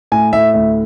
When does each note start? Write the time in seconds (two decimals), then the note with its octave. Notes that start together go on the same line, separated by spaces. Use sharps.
0.12 A2 G#5
0.33 A2 E5
0.54 D2 E5